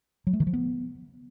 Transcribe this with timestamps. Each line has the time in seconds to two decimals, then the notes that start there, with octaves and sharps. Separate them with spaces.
0.27 F#3
0.33 A3
0.40 D#3
0.47 F3
0.53 B3